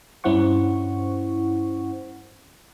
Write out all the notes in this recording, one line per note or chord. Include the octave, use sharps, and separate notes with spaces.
G2 C#4 E4 C5 F#5 C#6